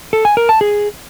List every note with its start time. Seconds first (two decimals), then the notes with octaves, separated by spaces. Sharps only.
0.13 A4
0.25 G#5
0.37 A#4
0.49 A5
0.61 G#4